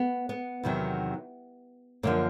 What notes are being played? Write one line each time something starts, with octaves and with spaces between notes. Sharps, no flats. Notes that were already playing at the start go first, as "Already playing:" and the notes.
Already playing: B3
B3
E2 C3 D#3 F#3
F#2 D3 F3 A#3